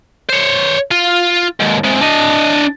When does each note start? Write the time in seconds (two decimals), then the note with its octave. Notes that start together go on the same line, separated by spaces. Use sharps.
0.29 C5 C#5
0.91 F4
1.60 D#2 G#2
1.84 C3 G#3
2.01 D4 D#5